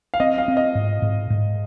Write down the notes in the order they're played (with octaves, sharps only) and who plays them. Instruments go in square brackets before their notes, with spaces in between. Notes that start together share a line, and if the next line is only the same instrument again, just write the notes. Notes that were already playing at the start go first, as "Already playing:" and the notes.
[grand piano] F5
[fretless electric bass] C4 [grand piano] D#5
[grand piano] F5
[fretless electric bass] C4
[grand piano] D#5
[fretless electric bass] G#2
G#2
G#2